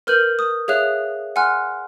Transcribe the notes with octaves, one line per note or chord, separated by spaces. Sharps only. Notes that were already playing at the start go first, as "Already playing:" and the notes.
A#4 B4 F6 G6 D#7 F#7
D#6
G#4 C#5 E5 F5 F#6 F7
F#5 G#5 C6 F6 F#6